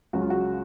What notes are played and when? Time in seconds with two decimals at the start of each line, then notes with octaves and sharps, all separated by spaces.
0.13 C#2 C#3 F#3 F#4
0.22 F4
0.30 F#4